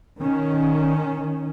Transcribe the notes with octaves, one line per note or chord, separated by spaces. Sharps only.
D#3 C#4